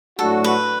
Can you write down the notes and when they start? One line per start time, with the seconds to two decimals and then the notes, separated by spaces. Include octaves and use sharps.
0.19 A2 F#3 A3 D4 F#4 A4
0.44 B4